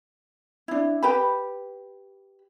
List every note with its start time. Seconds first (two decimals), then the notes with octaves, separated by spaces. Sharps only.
0.68 D4 E4
1.03 G4 B4 B5